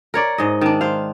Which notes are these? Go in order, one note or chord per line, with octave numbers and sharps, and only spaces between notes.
A#4 C#5 D5
G#2 D#5
D#3 D4
C5 F5